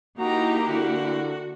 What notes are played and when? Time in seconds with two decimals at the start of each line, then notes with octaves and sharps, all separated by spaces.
0.19 A#3 D#4 E4 F#4 G4 A#5
0.68 D3 F#4